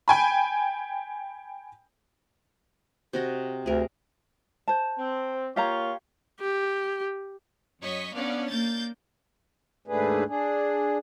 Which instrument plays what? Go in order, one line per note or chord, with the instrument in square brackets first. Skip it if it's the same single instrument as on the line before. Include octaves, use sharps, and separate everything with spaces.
[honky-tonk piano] G5 G#5 B5
[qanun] C3 F#4 D#5
[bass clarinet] D2 [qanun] G#4 A#4
[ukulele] C5 A5
[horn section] C4
[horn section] A#3 F4 C#5 [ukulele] G4 F5 A#5
[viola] G4
[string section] F#2 C#5 D#5 C#6 B6
B3 C#4 D4 C#5 D5 F5
A#3 G6 A6
[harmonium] D#2 G#2 A3 D4 G#4 B4
D4 G#4